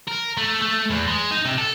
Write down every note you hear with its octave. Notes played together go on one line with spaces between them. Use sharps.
A#4
A3
A3
E2
G#3
D#4
C3
A4